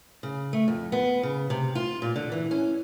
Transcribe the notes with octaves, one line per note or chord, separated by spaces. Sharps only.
C#3
A3
F2
B3
C#3
C3
F4
A#2
D3
E3
C#4